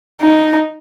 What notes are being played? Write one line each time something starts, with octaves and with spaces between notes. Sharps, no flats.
D#4